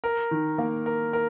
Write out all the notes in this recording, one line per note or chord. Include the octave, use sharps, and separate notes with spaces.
A#4
D#3
A#3
A#4
A#4